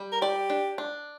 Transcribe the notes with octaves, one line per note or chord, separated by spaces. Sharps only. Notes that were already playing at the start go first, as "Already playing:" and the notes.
Already playing: G3
A#4
G4 D5
D4
D4